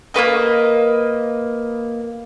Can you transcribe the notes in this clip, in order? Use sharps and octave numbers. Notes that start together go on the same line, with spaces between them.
A#3 F#4 B4 D#5